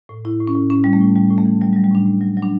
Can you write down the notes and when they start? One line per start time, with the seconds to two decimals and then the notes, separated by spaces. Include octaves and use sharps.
0.09 A2
0.25 A2 E4
0.40 A2
0.47 C#4
0.55 A2
0.70 A2 C#4
0.84 A2 G3
0.93 A3
1.01 A2
1.16 A2 G3
1.30 A2
1.38 A3
1.46 E3
1.61 F#3 G3
1.73 G3
1.76 F#3
1.84 G3
1.91 A2 D4
2.06 A2
2.21 F#3
2.37 F#3
2.42 D4